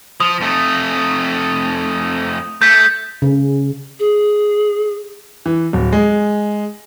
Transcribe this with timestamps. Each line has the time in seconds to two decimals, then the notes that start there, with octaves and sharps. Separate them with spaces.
0.20 F3 D#6
0.41 F2 A3
2.62 A3 G6 B6
3.22 C#3
3.99 G#4
5.46 E3
5.73 D1
5.92 G#3